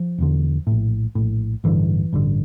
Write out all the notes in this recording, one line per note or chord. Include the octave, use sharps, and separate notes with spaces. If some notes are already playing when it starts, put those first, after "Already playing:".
Already playing: F3
E1 E2 D3
A#1 A2
A#1 A2
A1 G2 D3 E3
A1 G2 D3